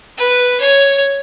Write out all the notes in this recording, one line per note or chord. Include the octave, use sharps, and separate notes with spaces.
B4
C#5